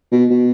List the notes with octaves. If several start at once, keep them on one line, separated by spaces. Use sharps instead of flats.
B2
B2